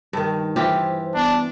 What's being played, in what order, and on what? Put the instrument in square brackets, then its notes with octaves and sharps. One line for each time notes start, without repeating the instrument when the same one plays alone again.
[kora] G2 D#3
[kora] E3 F4 G4 [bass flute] C5
[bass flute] B3 [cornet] D4